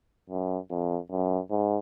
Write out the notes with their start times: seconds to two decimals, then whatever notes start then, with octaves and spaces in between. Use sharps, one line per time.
0.29 F#2
0.70 F2
1.11 F#2
1.50 G#2